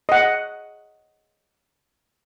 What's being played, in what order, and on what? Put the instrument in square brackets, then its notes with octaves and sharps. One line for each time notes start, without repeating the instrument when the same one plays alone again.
[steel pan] D#5 F#5